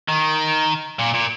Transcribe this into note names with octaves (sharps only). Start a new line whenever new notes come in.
D#3
A#2
A#2